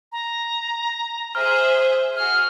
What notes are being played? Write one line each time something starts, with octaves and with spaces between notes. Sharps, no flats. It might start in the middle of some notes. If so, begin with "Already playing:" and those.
A#5
G#4 C5 E5 F6
F#4 G#4 F6